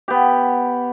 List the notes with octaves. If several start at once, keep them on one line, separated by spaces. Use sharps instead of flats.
B3 G4